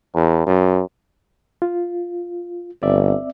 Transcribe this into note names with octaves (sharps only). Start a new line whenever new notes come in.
E2
F#2
F4
G1 C4 D5 E5